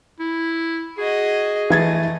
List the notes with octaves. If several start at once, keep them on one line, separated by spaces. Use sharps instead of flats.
E4
F#4 G#4 D#5
E3 A3 D#5 G#6 A6